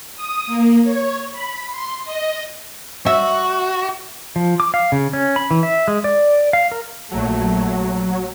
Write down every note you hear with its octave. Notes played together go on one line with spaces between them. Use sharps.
D#6
A#3
C#5
B5
C6
D#5
F#4 E5
F3
D6
F5
C#3
C#4
B5
E3
E5
G#3
D5
F5
A#4
A#1 F#3 A3